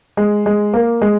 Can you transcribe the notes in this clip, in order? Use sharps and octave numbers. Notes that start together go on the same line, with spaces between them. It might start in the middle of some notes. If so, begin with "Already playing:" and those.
G#3
G#3
A#3
G#3